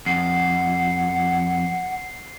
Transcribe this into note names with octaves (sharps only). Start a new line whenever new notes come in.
F2 F#5 C7